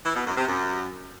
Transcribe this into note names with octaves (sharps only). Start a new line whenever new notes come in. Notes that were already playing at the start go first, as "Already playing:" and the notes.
E3
B2
F#2
C3
F#2